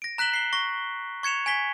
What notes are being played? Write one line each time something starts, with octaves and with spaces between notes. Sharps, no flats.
A#6 D7
A#5 F#6 B6 E7 F#7 G7
C7 G7
C#6 A#6 G7
C#6 G#6 C#7 E7 F7
G#5 G#6 B6 G7